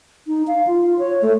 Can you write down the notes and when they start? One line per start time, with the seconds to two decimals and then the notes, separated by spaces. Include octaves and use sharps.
0.27 D#4
0.47 F5
0.67 F4
0.99 C#5
1.22 A3